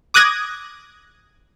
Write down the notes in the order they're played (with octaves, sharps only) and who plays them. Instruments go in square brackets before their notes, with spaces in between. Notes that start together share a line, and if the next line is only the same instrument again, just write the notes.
[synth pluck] D6 D#6 F#6 G#6 A#6